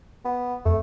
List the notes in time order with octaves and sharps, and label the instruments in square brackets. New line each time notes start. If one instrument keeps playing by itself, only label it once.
[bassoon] B3
[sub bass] F2 [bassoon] A3